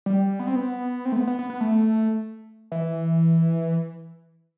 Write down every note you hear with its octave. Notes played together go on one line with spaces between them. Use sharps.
G3
B3
C4
B3
C4
A3
B3
B3
B3
B3
A3
E3